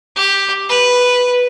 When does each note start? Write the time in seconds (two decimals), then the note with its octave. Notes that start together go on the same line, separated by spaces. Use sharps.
0.16 G4
0.69 B4